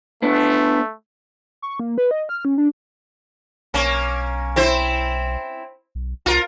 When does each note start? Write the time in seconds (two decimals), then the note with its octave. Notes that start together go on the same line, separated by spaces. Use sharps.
0.22 A3 B3 D4
1.62 C#6
1.80 A#3
1.98 B4
2.11 D#5
2.29 F6
2.45 C#4
2.58 D4
3.74 B1 A#3 C#4
4.56 C4 E4 C5
5.95 B1
6.26 C2 F4 A#4